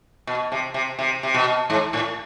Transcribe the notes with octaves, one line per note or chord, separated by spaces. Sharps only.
B2
C3
C3
C3
C3
B2
G#2
A2